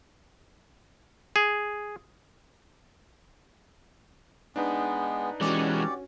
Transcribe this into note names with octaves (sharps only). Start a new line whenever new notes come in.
G#4
G#3 B3 D4 D#4 B4
E3 G#3 C#4 F#4 G4 D5